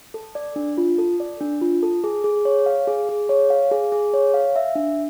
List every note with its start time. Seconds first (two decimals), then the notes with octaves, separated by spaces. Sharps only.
0.14 A4
0.35 D5
0.56 D4
0.78 F4
0.98 A4
1.20 D5
1.41 D4
1.62 F4
1.83 A4
2.04 G#4
2.24 G#4
2.45 C#5
2.66 F5
2.87 G#4
3.09 G#4
3.29 C#5
3.50 F5
3.71 G#4
3.92 G#4
4.14 C#5
4.34 F5
4.56 E5
4.76 D4